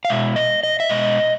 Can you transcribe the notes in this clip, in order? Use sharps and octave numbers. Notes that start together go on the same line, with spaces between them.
F5
B2 G#3 E5
D#5
D#5
E5
B2 G#3 D#5